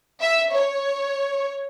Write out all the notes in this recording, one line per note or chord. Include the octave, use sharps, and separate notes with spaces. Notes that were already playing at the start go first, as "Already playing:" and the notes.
E5
C#5